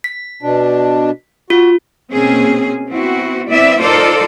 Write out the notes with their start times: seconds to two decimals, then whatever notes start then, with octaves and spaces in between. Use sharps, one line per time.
0.04 B6
0.43 B2 D4
1.50 F4 F#4
2.11 B2 A#3 C4 C#4 G#4
2.89 B3 C4 E4 F#4
3.49 B3 C4 E4 D5 E5
3.81 D#4 F4 A4 A#4 C5 D5